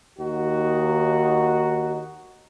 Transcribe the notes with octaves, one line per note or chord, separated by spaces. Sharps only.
D#2 D#4 F#4